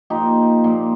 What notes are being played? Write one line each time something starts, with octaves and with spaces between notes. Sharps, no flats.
A#2 F3 A#3 D#4 G4
A#2 F3 A#3